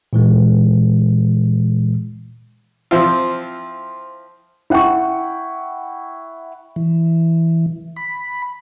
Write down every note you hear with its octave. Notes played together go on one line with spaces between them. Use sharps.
A#2 E3 G#3
F3 C4 E4 F4
E4 F#5 G5 C#6
E3
B5